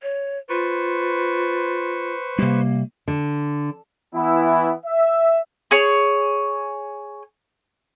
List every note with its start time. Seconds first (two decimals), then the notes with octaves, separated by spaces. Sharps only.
0.02 C#5
0.49 F4 B4 C5 C#6
2.38 C3 G3 A#3
3.08 D3
4.14 E3 B3 E4
4.85 E5
5.71 G#4 C#5